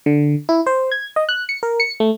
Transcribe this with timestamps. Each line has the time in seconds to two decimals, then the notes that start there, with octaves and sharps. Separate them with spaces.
0.06 D3
0.49 E4
0.66 C5
0.92 G#6
1.16 D#5
1.29 F#6
1.49 C#7
1.63 A#4
1.80 C#7
2.00 A3